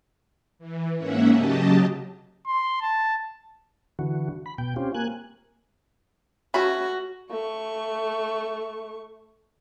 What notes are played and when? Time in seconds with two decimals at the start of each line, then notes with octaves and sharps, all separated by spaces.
0.59 E3
0.97 G#2 A#3 C#4 E5 F#5
1.32 C#3 F#3 G4 D#5 A5
2.46 C6
2.81 A5
3.99 D3 E3 F#4
4.46 B5
4.58 B2 G5
4.76 C4 C#4 F4 G4
4.94 A#3 G#5 F#6
6.54 A3 C#4 F#4 B5
7.31 A3 C#6